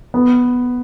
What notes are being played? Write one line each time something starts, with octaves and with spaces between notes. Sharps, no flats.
B3